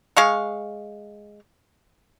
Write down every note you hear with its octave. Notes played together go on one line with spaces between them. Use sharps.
G#3 F5 C#6